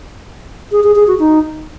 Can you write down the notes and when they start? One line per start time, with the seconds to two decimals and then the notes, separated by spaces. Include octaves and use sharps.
0.72 G#4
0.84 G#4
0.96 G#4
1.07 F#4
1.19 D#4